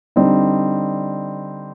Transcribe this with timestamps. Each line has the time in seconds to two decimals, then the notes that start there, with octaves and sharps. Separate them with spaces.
0.16 D3 G3 C4 D#4